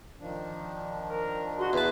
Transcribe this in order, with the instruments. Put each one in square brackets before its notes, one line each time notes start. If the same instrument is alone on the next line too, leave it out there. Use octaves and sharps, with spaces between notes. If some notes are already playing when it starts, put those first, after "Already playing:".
[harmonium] D#3 F3 D4
[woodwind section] A#4
[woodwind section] B2 G#4 [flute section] F#4 C6
[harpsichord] E2 A5 [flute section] B4